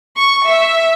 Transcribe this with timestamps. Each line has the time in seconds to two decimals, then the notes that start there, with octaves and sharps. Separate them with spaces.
0.17 C#6
0.46 E5